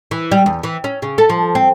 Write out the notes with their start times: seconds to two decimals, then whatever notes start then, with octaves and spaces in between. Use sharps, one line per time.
0.11 E3
0.32 G3
0.46 E2
0.63 E3
0.84 C#4
1.02 C#3
1.18 A4
1.29 F3
1.55 C4